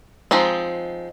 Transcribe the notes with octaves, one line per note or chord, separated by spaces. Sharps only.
F3 G#3 C4 D#4